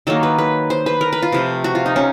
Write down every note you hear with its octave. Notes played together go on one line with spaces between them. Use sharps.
D#3 F#3 A#3 A4
B4
B4
C5
B4
A#4
B4
F4
C3 F3 A3
F#4
F4
D#4
C#4